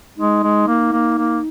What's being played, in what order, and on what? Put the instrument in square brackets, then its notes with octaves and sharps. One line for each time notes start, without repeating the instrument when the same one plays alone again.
[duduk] G#3 [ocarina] D#4
[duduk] G#3
A#3
A#3
A#3